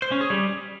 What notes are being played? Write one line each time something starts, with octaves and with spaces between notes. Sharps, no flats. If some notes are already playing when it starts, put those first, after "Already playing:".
C5
C#4
G#4
G3